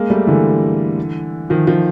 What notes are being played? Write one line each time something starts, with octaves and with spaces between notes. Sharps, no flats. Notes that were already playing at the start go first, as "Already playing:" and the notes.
Already playing: G#3 A#3
G3 A3
D3 E3
D#3 F3
D#3 F3